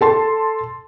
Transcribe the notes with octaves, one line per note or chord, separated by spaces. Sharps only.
A4 A5 C6